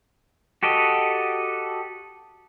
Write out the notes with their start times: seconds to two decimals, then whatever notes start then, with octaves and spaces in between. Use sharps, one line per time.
0.63 F#4 G4 A4 D#5